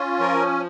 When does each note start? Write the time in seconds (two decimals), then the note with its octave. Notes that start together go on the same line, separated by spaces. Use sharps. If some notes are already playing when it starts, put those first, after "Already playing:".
Already playing: C#4 F4
0.19 F3 A#4